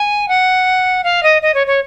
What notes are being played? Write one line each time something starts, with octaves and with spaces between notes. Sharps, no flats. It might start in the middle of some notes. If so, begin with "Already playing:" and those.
Already playing: G#5
F#5
F5
D#5
D#5
C#5
C#5